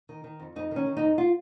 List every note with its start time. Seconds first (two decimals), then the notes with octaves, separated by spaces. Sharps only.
0.09 D#3
0.24 D#3
0.40 F2
0.56 F2 D#4
0.71 D#3 C#4
0.86 D#3
0.97 D#4
1.02 F2
1.18 F4